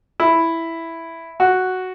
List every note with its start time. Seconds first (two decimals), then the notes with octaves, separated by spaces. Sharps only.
0.20 E4
1.40 F#4